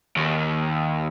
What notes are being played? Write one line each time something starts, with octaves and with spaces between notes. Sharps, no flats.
D#2